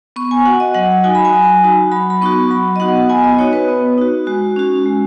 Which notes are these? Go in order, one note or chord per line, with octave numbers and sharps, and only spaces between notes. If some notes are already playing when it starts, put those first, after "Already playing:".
B3 C#6
G#5
F#4 F#5
D#5
F#3 F#5
D#4 F#4 G#5
B5
G#5
F#3
D#4 F#4
F#3 B5
B5
B3 D#4 F#4 C#6
F#3 B5
D#5
B3 D#4 F#4 F#5
B3 G#5
D#5
D#4 F#4 C#5
B4
B3
D#4 F#4
G#3 F#4
C#4 F#4
G#3